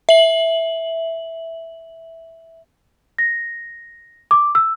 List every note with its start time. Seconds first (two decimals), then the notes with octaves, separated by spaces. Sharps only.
0.09 E5 F#7
3.19 A#6
4.31 D6
4.55 E6